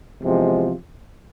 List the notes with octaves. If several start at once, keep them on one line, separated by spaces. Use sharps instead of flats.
E2 C3 F3 G#3